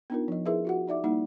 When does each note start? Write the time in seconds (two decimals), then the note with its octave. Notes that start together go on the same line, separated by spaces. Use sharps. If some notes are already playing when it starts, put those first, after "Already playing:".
0.10 B3 D4 D#4 F4 A#4
0.28 F3 D#5
0.46 E4 G#4 A#4 B4 D#5 E5
0.65 F4 F#4 F#5
0.87 D#4 D5 E5 D6
1.04 G3 A#3 D#4 E4 F#5